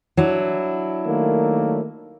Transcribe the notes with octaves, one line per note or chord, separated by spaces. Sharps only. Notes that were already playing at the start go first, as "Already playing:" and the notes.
F#3 D4 E4
D#3 A3 A#3